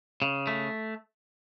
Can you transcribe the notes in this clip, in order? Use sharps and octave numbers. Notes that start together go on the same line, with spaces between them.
C#3
A3